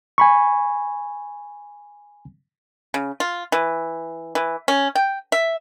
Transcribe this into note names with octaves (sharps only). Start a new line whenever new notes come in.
G#5 B5 C#6
C#3
F4
E3
E3
C#4
G5
E5